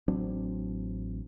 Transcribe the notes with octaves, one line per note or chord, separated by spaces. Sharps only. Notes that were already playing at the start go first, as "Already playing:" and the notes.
A1 F#3 C4 D4